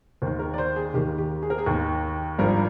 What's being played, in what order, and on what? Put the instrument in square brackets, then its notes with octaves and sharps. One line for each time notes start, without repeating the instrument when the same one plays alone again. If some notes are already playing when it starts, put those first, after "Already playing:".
[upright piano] D#2 D#3 C5
A#4
D5
C5
G#4
D#2 D#3 G4
G4
G#4
A#4
G#4
D#2 D#3
G#1 G2 F3 A#4